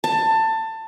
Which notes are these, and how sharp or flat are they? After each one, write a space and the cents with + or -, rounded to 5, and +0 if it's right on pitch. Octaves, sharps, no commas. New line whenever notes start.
A5 +20